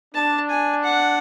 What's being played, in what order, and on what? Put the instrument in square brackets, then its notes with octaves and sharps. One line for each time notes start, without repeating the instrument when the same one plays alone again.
[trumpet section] D4 [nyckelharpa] A5
[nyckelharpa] G#5
F#5